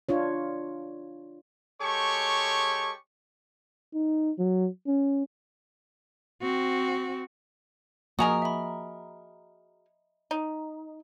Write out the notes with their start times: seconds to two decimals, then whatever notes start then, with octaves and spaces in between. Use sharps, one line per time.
0.09 D4 F4 C#5
1.82 G#3 G4 A4 C#5 C#6
3.94 D#4
4.39 F#3
4.87 C#4
6.42 C4 F#4
8.19 F3 A#3 F#4 G#4 A#4 D#5 A#5 D#6
8.42 E5 B5
10.31 D#4